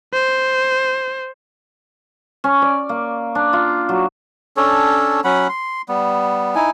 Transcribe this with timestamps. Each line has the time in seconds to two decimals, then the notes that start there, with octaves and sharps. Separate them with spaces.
0.13 C5
2.44 C#4
2.62 D5
2.89 A#3
3.35 D4
3.53 F4
3.89 F#3
4.57 C#4 D4 A4 C#5
5.24 F#3 C#4 F#5 B5
5.49 C6
5.89 G3 B3
6.55 D#4 E4 G#5